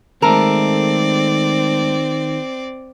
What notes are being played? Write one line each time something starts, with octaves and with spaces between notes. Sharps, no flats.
D#3 G#3 A3 C4 A4 A#4 D5